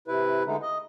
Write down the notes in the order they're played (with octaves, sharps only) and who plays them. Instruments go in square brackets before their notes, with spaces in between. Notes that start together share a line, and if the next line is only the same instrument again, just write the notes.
[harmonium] C3 E4 B4
D3 G#3 A3 D#4
D#5